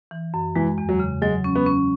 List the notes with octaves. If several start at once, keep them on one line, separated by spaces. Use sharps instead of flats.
E3
F#2
E3 G#3
E2
F#3
C#3
F#3 G#3
C#4
B3
C#4